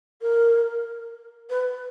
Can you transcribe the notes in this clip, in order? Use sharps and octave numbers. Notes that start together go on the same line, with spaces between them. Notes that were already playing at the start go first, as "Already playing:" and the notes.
A#4
B4